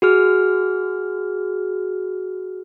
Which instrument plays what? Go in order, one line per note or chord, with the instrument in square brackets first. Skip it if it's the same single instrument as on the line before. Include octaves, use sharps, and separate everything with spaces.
[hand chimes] F#4 G#4 F6